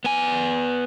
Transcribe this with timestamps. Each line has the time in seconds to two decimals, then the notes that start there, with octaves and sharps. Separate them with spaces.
0.04 B3 G#5